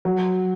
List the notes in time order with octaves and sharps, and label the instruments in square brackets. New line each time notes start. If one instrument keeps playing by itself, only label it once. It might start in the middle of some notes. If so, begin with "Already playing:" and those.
[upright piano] F#3